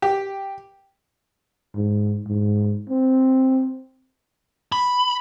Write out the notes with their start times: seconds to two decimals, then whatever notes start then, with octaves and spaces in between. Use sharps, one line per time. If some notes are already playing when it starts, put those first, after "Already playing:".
0.02 G4
1.75 G#2
2.26 G#2
2.90 C4
4.72 B5